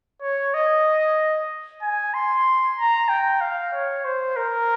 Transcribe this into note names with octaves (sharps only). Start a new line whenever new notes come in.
C#5
D#5
G#5
C6
A#5
G5
F5
C#5
C5
A#4